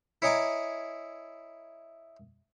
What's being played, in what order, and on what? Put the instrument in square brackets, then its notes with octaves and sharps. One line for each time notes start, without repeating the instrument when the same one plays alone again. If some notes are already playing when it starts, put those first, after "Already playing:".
[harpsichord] E4 C#5 D#5 G#5 A#5 D6